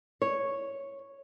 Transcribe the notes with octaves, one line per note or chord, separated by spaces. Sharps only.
C#5